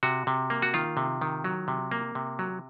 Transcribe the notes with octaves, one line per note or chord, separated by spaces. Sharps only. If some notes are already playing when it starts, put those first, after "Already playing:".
C3 F#4
C3
A#3
F#4
D#3 F4
C3
D#3
F#3
C3
A#3
C3
F#3